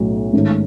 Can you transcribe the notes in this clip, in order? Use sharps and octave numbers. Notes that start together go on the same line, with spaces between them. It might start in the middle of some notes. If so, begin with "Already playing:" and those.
Already playing: B1 A2 F#3 C#4 F#4
G#2 D#3 A3 C#4